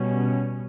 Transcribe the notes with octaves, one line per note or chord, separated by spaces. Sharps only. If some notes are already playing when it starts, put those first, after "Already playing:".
Already playing: B2 G3 C#4